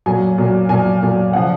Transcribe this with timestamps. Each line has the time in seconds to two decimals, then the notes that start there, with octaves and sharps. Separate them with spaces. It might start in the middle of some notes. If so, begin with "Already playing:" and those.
0.06 A#2 F#3 G#5
0.38 A#2 F#3
0.69 A#2 F#3 G#5
1.03 A#2 F#3
1.33 C#3 F3 F#5